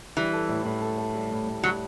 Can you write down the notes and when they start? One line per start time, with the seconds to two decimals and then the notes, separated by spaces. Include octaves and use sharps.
0.17 E3 G3
0.33 A4
0.49 A2
0.65 A2
0.82 A4
0.98 A4
1.15 G3
1.31 A2
1.47 A2
1.63 F#3 G3